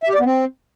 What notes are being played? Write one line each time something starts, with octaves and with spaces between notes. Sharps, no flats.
E5
G4
D5
B3
C4